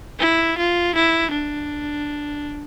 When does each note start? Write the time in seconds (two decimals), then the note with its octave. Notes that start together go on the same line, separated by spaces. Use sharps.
0.19 E4
0.58 F4
0.95 E4
1.31 D4